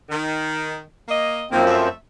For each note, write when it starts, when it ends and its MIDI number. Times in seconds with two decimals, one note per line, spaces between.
0.10 0.81 51
1.09 1.43 58
1.09 1.43 75
1.51 1.89 42
1.51 1.62 51
1.51 1.89 53
1.51 1.62 58
1.51 1.89 60
1.66 1.91 41
1.66 1.91 57
1.66 1.91 76